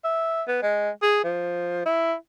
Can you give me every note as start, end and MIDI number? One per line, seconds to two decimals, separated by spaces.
0.04 0.43 76
0.48 0.58 59
0.63 0.90 56
1.03 1.22 68
1.24 1.84 53
1.86 2.14 64